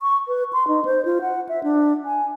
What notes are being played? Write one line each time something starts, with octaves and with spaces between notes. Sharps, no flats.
C#6
B4
C6
D#4
C5
F4
F#5
E5
D4
G#5